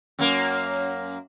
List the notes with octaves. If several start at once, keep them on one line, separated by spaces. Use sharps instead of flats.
F#2 A#3